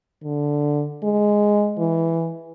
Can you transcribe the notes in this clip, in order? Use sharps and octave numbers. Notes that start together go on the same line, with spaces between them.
D3
G#3
E3